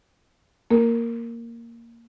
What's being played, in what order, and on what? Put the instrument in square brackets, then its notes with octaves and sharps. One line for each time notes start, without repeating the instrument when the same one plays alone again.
[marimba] A#3 A#4